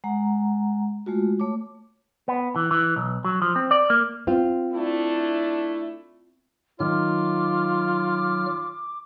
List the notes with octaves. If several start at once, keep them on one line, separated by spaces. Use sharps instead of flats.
G#3 F#5 A#5
G#3 A3 F4 F#4
A3 C#5 D6
B3
E3
E3
B1
F#3
F3
C4
D5
A#3
C4 F4
A3 D4 E4
D#3 F#3 F4 D6 F6